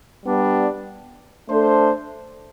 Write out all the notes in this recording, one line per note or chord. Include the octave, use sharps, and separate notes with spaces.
G3 B3 D4
A3 D4 A4 C5